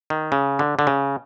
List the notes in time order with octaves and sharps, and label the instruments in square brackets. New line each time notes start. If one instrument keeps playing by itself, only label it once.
[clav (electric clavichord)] D#3
C#3
D3
D3
C#3